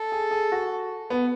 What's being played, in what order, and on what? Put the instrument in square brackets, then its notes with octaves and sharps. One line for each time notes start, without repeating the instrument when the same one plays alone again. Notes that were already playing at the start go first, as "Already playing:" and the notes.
Already playing: [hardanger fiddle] A4
[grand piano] G#4
G#4
F#4
B3